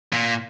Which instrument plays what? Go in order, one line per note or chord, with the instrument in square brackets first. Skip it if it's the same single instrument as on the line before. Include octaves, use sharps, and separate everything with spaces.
[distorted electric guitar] A#2